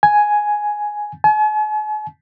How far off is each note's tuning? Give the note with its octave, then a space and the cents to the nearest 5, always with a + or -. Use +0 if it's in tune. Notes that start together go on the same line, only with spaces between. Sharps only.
G#5 +5
G#5 +45